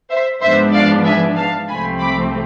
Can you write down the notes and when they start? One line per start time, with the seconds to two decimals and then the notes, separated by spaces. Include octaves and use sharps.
0.10 C5 E5
0.41 G#2 F3 B3 D4 C5 E5
0.74 D5 F5
1.04 E5 G#5
1.37 F5 A5
1.68 C2 C3 F3 A3 C4 G#5 B5
2.00 B5 D6